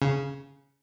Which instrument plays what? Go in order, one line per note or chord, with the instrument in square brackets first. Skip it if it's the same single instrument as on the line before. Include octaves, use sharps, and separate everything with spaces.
[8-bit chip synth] C#3